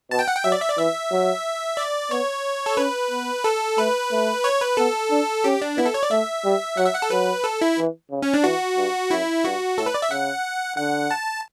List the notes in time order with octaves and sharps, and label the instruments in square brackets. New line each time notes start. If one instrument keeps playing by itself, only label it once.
[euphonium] B2 [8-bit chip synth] A5
[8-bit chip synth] G5
F#5
G5
[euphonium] F#3 [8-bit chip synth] E5
[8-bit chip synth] D5
E5
D5
[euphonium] E3 [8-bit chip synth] E5
[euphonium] F#3
[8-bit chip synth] D5
[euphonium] B3 [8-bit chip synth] C#5
[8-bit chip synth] A4
[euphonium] C#4 [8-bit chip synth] B4
[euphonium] B3
[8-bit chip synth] A4
[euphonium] A3 [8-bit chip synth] B4
[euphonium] A3
[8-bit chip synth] C#5
B4
[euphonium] B3 [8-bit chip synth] A4
[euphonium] D4
[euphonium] C#4 [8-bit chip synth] G4
[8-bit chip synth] D4
[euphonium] B3 [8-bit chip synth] E4
[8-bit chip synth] A4
C#5
D5
[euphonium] A3 [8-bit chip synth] E5
[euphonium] G3
[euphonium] F#3 [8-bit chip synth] F#5
[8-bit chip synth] E5
F#5
A4
[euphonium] F#3 [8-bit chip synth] B4
[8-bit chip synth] A4
E4
[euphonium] E3
C#3
[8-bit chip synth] C#4
D4
[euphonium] E3 [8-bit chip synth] F#4
[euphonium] G2
[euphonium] F#2 [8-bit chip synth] E4
[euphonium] G2 [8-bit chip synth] F#4
[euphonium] A2 [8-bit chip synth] A4
[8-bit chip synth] B4
D5
E5
[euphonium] C#3 [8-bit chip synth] F#5
[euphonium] D3 [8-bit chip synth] F#5
[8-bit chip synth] A5